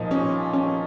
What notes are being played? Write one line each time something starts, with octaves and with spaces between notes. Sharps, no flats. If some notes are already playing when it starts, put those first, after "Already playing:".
Already playing: A#2 F3 D#4
C#4
C#4